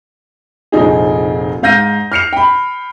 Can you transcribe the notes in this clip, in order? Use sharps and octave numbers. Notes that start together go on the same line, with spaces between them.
F1 A#1 F3 D#4 G#4
G#2 F5 G6 A#6 D#7
F6 C7 C#7 F7
G5 B5